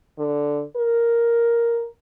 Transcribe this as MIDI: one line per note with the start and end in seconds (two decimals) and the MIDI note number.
0.18 0.63 50
0.76 1.88 70